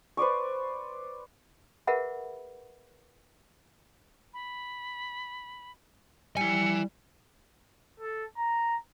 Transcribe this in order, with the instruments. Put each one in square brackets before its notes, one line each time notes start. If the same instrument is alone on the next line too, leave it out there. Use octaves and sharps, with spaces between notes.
[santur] B4 C5 D5 C#6
[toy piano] G#4 A#4 B4 E5 F#5 B5
[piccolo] B5
[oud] G3 [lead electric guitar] E4 G#5 [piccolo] C#7
[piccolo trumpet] A4
A#5